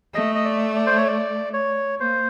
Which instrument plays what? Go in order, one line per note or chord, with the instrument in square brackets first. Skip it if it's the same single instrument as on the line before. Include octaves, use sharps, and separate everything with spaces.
[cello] A3 [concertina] D#5
[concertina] D#5
D5
D5
C5
C#5
D5
C#5
[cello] A#3 [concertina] C5